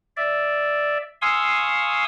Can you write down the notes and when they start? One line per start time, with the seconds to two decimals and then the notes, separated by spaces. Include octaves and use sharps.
0.17 D5 E5
1.22 F5 G#5 C6 C#6 D#6 E6